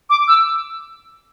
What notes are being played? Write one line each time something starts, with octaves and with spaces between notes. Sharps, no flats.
D6
E6